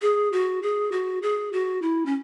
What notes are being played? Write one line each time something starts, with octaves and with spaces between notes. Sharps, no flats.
G#4
F#4
G#4
F#4
G#4
F#4
E4
C#4